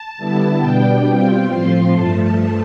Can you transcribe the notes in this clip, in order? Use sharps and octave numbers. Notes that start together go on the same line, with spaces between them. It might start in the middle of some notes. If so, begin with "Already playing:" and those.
Already playing: A5
D3 G3 B3 E4
B2 G3 B3 D4 G5
B2 G3 C4 F4
A2 F3 C4 F4 C6
G2 F3 A3 A5